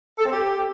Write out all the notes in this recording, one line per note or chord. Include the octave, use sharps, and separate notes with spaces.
A4
C4
G4